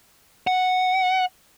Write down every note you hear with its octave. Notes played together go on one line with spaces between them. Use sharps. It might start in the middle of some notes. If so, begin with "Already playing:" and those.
F#5